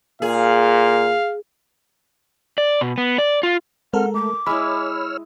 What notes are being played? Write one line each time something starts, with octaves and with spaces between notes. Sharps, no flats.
A#2 G#4 F5
D5
B2
B3
D5
F4
G#3 C4 A4 A#4 F#5 F6
A3 D6
G#3 E4 C#5 B5 E6 F6